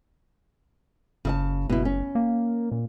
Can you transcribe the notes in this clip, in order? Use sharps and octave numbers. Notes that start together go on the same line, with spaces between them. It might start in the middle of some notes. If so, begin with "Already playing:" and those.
F#1 C#3 E5 A5
F#1 B2 E4
C#4
A#3
A#2